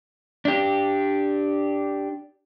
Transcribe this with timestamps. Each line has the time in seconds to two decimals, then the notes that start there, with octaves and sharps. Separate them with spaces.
0.45 D4 G4